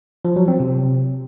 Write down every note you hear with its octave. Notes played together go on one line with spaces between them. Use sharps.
F3
F#3
C4
C3